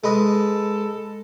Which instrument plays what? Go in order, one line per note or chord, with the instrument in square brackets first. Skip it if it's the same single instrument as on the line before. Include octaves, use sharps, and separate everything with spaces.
[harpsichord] G#3 B4 D#5 [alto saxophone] A4